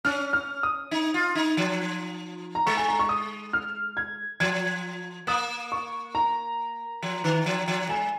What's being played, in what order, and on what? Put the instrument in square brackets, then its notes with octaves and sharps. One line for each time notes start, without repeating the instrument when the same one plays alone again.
[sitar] C#4 [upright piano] F6
[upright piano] F6
D#6
[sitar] D#4
F4
D#4
F3
[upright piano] A#5
[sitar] G#3 [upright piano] C#6
[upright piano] G#5
A#5
C#6
D#6
F6
G#6
[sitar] F3 [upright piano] G#6
[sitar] A#3 [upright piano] D#6
[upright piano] C#6
A#5
[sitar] F3
D#3
F3
F3
[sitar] G#3 [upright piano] G#5